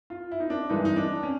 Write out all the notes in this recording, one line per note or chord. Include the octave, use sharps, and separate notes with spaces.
F4
E4
D#4
D4
G2 E3 G#3 D#4
D#4
D4
C#4